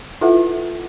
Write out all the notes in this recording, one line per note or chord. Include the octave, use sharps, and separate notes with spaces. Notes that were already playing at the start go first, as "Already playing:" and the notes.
E4 F4 A4 B4 E5 F#5